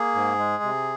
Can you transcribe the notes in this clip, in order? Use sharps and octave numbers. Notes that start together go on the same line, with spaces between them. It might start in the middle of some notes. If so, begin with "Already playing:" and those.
Already playing: A#3 G#4
G#2
G#3
C3